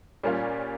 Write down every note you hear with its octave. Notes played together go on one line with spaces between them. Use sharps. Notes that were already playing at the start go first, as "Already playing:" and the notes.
A#2 G3 A#3 C#4 F4